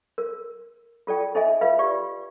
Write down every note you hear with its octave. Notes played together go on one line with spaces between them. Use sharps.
A#4
F4 A4 D5 G5
D#4 A4 D#5 E5 G#5
F4 B4 E5 F5
F4 G4 D5